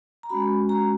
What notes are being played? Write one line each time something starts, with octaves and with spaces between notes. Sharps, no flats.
A#5
G#3 C#4 F#4 B5
A#5